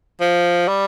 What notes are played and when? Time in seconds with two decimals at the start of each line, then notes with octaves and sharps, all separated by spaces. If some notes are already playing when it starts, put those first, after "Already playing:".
0.21 F3
0.68 G3